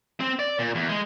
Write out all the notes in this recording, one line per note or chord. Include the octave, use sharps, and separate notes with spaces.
C4
D5
A#2
E2
G#3